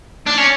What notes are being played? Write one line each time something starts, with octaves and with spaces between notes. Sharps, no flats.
D4
C#4